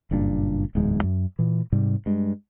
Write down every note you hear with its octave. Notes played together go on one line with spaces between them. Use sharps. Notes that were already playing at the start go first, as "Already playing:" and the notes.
F#1 G2 A#2 D4
D1 E2 G#2 G#3
F#2
A#2 E3
G#2 C3 G3
G2 G#3